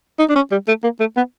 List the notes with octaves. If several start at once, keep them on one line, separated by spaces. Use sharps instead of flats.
D#4
D4
C#4
G3
A3
A#3
A3
B3